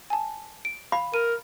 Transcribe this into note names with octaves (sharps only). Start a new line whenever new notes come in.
G#5 A5
D7
F5 B5
A#4 D#7